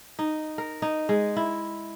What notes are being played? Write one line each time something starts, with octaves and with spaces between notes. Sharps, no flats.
D#4
A#4
D#4
G#3
E4